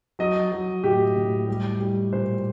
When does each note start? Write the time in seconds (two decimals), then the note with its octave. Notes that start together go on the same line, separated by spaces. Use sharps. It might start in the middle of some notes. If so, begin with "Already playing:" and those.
0.19 F#3 D#5
0.52 F#3
0.84 A2 G4
1.16 A2
1.48 G3
1.80 G3
2.13 A#2 C5